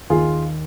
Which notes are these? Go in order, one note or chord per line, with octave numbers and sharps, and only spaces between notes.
D#2 D#3 F4 G#4